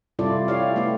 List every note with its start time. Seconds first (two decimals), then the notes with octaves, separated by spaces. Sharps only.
0.19 C3 G3 E4 F4 A4 D5
0.48 E4 G4 C#5 D5 F5
0.76 A3 B3 E4 G4